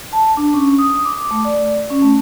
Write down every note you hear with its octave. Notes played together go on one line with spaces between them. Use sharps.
A5
D4
C#4
D#6
D6
A3
D5
C#4
A3